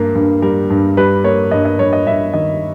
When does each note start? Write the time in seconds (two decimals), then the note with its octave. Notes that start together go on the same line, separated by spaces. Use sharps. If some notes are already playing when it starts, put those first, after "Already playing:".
Already playing: G2 A#3
0.15 G2
0.42 G3 A#4
0.70 G2
0.97 G3 B4
1.24 A#3 C#5
1.51 G2 D#5
1.65 D#5
1.79 G2 C#5
1.93 D#5
2.07 G2 E5
2.34 D#3 D#5